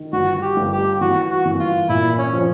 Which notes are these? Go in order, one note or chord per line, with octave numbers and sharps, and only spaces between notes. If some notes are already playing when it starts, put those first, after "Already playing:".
Already playing: D#3
G1 F#4
G4
G1
G4
E3 F#4
F#4
E3
F4
A#2 E4
C#4
F3